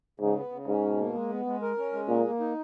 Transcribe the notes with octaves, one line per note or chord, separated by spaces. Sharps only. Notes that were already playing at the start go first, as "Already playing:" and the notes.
G#2 C#3
B3
C#3
G#2 C#4
B2
A#3
G#3
B3
G#3
A#4
C#4
G#3
A#2 A#3
A#3
D#4